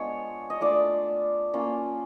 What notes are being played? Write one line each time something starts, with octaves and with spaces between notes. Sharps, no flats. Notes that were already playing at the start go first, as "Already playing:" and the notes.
Already playing: G#3 B3 D4 F4 C#5
D#5
A3 D4 F4 D5
A#3 C#4 F4